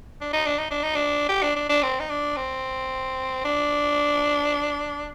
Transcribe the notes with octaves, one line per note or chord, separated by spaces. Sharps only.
D4
D#4
D4
D#4
D4
D#4
D4
G4
D4
D4
D4
C4
D#4
D4
C4
D4